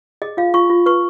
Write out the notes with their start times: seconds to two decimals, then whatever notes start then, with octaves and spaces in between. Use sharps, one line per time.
0.22 G#4 D#5
0.37 F4 F5
0.54 F4 C#6
0.70 F4
0.86 B4 C#6